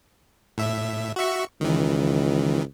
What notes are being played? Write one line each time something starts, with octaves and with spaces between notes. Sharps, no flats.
A2 E5
F#4 E5 C#6
C#2 D#3 E3